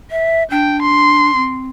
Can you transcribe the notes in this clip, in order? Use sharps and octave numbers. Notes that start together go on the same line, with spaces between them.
E5
D4 G5
C6
C4